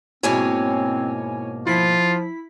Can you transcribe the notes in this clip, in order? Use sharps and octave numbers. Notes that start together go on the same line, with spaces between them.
G#2 B2 A#3 C4 E4 C#5 G#5
F3 E4 F4 B6